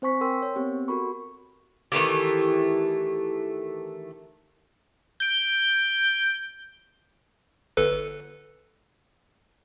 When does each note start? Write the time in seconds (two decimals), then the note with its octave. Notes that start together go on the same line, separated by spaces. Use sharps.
0.02 C4 C5 G#5 C#6 B6
0.21 A#4 G5 C6 E6
0.42 C#5
0.56 B3 C4 G4
0.88 F#4 A4 A#4 B5 C#6
1.92 D#3 E3 A3 G4
5.20 G6 D7
7.77 G1 A4 B4